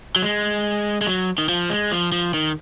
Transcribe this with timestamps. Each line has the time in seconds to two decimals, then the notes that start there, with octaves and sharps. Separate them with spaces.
0.16 F#3
0.22 G#3
1.01 G#3
1.07 F#3
1.38 D#3
1.49 F3
1.70 G#3
1.92 F3
2.12 F3
2.34 D#3